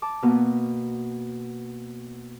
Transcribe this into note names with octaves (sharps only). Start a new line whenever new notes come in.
A5 D6
B2 A#3 B3